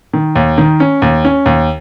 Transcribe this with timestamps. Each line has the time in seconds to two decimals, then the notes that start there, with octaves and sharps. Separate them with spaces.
0.13 D#3
0.36 D#2
0.58 D#3
0.80 C#4
1.02 D#2
1.25 C#4
1.46 D#2